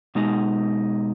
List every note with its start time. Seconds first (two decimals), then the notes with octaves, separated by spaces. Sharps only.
0.15 B2 G#3 D#4